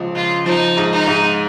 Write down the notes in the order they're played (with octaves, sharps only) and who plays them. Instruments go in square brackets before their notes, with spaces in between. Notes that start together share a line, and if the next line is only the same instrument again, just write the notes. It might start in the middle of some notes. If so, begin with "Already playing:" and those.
Already playing: [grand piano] C#2 F3
[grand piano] C#2 [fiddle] F4
[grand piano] F3 [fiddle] D#4
[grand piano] G#2
[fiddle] D#4
[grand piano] G#2